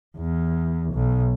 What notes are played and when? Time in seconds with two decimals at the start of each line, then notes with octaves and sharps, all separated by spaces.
0.18 E2
0.94 B1